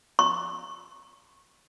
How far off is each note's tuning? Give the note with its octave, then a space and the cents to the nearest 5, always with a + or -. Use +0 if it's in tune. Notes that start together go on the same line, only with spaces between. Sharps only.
C#6 -25